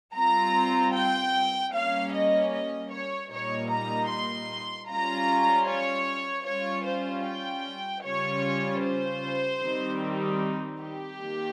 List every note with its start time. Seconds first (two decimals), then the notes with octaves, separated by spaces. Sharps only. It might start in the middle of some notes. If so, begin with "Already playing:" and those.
0.15 G3 C4 F4 A#5
0.93 G5
1.72 G3 A#3 C#4 F5
2.12 D#5
2.52 D#5
2.90 C#5
3.30 A#2 G3 A#3 D#4 C#5
3.70 A#5
4.09 C6
4.88 G3 C#4 F4 A#5
5.68 C#5
6.45 G3 C#4 F4 C#5
6.85 C5
7.25 G5
8.04 C#3 G3 C#4 F4 C#5
8.82 C5
9.61 D#3 G3 C4 D#4
10.81 G4
11.19 D#3 A#3